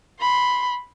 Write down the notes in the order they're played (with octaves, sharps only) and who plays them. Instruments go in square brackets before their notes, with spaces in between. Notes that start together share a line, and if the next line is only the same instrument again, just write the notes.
[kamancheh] B5 C6